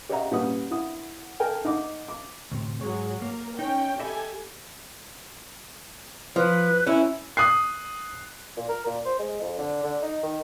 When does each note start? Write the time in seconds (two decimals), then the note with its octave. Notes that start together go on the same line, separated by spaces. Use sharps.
0.09 G4 C#5 D#5 E5 F#5 A#5
0.31 A#2 G3 C#4 B4 F#5 D#6
0.71 E4 F#5 D#6
1.40 A4 A#4 G5 G#5
1.65 D#4 F#5 D6
2.09 D6
2.52 D2 A2 C3
2.81 G#2 F#3 G#4 C#5
3.22 A#3 A#4
3.59 C#4 D#4 G5
3.99 G4 A4 D#5 E5 G#5 B5
6.36 F3 B4
6.87 C#4 E4
7.37 D#6 F#6 C7
8.57 A#2
8.69 A#4
8.86 A#2
9.05 C5
9.19 G#3
9.41 F2
9.58 D3
9.83 D3
10.02 D#4
10.23 D#3